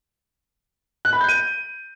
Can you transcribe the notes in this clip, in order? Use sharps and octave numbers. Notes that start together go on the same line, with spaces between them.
F#6
B5
G6
D#7